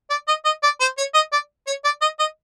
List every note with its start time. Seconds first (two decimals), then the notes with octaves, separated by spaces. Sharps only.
0.10 D5
0.28 D#5
0.45 D#5
0.63 D5
0.81 C5
0.98 C#5
1.14 D#5
1.32 D5
1.67 C#5
1.84 D5
2.01 D#5
2.19 D#5